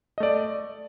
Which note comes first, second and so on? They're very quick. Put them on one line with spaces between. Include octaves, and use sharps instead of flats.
D#5 A3 D5